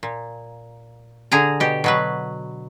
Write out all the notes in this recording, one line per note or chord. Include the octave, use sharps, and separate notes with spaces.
A#2
D3 G#4 G#5 A#5
B2 G4
B2 F#3 B4